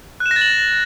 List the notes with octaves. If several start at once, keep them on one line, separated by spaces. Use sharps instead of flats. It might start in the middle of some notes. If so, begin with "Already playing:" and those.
F#6
E7
A#6
A6
F#7